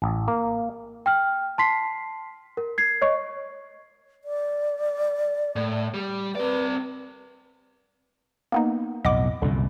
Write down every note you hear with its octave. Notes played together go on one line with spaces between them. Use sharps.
A1
A#3
G5 F6
A5 C6 B6 C7
A#4
G#6 C7
C#5 D#5 C#6
D5
A2
G3
C4 B4 D5
A#3 B3 D#4
B1 F2 A2 D#5 F#5 D6
C2 F#2 A#2 D3